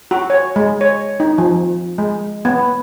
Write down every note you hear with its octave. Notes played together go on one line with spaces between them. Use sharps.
F#4
C#5
G#3
C#5
D#4
F3
G#3
B3